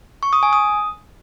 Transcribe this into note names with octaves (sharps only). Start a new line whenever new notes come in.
C#6
D#6
G#5
D#6